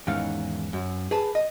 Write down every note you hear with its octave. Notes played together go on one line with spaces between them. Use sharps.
E2 G#2 D#3 E3 C#4 F5
F#2
G#4 B4 A5
D#5